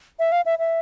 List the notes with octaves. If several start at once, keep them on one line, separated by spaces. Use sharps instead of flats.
E5
F5
E5
E5